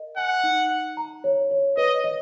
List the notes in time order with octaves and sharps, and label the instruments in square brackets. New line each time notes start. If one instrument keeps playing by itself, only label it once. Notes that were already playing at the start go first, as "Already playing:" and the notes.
Already playing: [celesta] A#4 D#5
[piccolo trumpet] F#5 [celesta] G#5
[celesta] D#4
F#5
A#5
C#5
C#5
[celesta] B4 [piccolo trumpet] D#5
[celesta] D#5